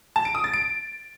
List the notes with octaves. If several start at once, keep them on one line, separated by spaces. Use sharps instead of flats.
A5
D7
D#6
A6
D7